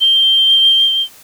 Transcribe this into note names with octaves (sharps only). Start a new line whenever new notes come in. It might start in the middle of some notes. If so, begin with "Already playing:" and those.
G7